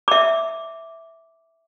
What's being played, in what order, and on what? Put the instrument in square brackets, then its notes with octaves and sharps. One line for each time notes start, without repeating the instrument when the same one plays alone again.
[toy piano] E5 D6